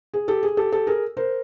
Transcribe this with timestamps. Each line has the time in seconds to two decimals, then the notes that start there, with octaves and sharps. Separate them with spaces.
0.14 G#4
0.28 G4 A4
0.43 G#4
0.57 G4 A4
0.72 G4 A4
0.87 G#4 A#4
1.17 A#4 C5